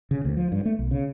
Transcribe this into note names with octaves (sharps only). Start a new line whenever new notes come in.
C#3
D2
F3
G2
A3
B1
C#3